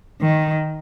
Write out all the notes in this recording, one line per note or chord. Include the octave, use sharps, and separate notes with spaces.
D#3